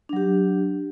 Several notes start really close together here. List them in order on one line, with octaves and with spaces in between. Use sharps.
D4 F#3 G4